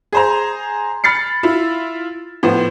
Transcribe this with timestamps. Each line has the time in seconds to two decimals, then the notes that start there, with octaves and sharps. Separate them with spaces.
0.12 G#4 C5 A#5
1.04 B5 F6 A6 C7 C#7
1.43 E4 F4
2.43 A2 F3 B3 C5